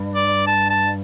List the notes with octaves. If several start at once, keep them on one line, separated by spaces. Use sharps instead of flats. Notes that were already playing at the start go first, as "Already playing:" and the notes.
Already playing: G2
D5
A5
A5